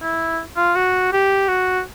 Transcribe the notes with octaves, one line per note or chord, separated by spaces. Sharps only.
E4
F4
F#4
G4
F#4